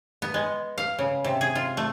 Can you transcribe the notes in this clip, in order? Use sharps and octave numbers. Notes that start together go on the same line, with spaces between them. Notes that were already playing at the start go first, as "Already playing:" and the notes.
B3
G#3
F5
C#3
C3
G#4
F4
A3